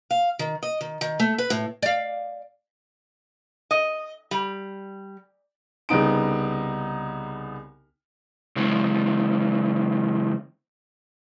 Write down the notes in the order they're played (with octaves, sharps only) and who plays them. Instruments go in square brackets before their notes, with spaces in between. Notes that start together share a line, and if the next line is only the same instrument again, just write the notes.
[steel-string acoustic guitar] F5
D#3
D#5
D#3
D#3
A3
B4
A2
[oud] D5 F5
[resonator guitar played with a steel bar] D#5
G3
[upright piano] C2 C#3 B3 D#4 D7
[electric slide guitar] C#3 E3 G#3